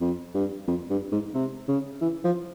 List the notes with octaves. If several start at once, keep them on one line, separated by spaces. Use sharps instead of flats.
F2
G2
F2
G2
G#2
C3
C#3
E3
F3